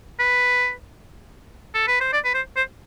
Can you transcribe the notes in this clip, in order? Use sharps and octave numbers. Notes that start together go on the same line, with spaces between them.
B4
A4
B4
C5
D5
B4
C5
C5